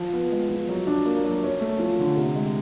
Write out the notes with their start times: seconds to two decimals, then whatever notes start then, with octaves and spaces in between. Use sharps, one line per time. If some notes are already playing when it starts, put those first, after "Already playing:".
Already playing: F3
0.13 B3
0.32 G#3
0.49 F3
0.69 F#3
0.87 D4
1.05 A#3
1.24 F#3
1.43 C#4
1.61 A3
1.80 F3
1.99 D3
2.17 C3
2.35 G#3